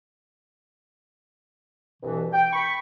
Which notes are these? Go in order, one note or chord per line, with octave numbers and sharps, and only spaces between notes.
C2 G2 B2 E3
G5
B5 C#6